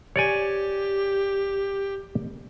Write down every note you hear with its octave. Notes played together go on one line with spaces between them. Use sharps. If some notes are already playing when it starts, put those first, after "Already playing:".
G4 C#5 D5 G#5